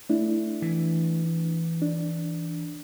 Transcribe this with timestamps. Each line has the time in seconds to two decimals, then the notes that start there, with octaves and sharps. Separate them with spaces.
0.09 A3 D4 E4
0.62 E3
1.82 D4